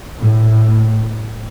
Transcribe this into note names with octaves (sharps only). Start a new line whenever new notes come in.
A2